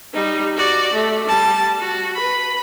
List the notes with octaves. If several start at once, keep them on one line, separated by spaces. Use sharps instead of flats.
G3 D#4
F#4 D5
A3
G3 A5
F#4
B4 B5